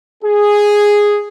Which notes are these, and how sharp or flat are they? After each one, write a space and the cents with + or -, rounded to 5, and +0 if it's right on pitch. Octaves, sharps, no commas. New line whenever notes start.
G#4 -5